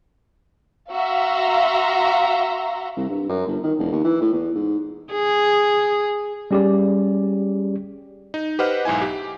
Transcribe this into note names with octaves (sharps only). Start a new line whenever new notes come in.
F#4 E5 F5 A#5 C6
C2
G2
F#2
G1
D#3
E1
D#2
E3
A2
E2
G#2
G#4
G3 C#4 G4 G#4 D5
D#4
G4 B4 C5 D#5 F#5 F6
B1 G#2 E4 G#5
G4